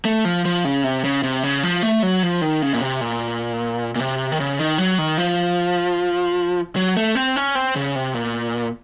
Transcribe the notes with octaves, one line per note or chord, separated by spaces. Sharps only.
A3
F3
F3
C#3
C3
C#3
C3
C#3
F3
A3
F#3
F3
D#3
C#3
A#2
C3
A#2
A#2
C3
D#3
C#3
D#3
F#3
D#3
F3
F#3
A3
C4
C#4
C4
C#3
C3
A#2